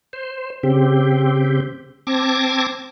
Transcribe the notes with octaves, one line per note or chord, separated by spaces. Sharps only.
C5
C#3 C4 G4
C4 A5 D6 G#6 A#6